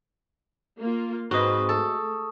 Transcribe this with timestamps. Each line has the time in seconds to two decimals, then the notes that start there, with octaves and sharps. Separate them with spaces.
0.80 A#3 F4
1.31 G#2 C4 F#4 B4 D#5 C#6 D#6
1.69 A3 A4